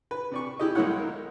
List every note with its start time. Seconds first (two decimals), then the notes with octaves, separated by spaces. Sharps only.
0.11 B4
0.31 C3 D5 C#6
0.59 E4 G4 D#5
0.75 B1 G#3 A#3 E4 C#5 F#5
0.99 A#4